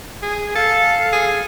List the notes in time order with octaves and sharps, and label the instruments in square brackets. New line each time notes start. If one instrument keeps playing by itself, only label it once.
[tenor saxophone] G#4
[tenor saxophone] A4 [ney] F5
[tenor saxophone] G#4